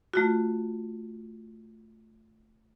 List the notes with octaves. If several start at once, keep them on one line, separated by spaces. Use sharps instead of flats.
A3 F4 F#4